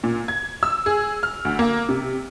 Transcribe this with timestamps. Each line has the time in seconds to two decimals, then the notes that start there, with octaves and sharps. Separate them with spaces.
0.04 A#2
0.28 G#6
0.63 E6
0.86 G#4
1.23 F6
1.45 D2
1.59 A#3
1.89 C3